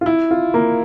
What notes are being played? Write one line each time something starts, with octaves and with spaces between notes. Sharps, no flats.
F4
E4
F4
A#3